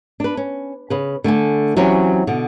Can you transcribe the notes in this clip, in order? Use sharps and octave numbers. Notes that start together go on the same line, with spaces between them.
D4 B4
C#4
C#3 B4
D3 A3 A4 G#5
E3 F#3 C4 C#4 G4 C#5
B2 D3